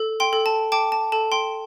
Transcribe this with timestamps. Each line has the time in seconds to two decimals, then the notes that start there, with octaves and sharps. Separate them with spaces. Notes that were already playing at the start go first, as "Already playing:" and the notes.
Already playing: A4
0.20 G5 C6
0.33 A4
0.46 A5
0.72 G5 A5 D6
0.92 A5
1.12 A4 A5
1.32 G5 C6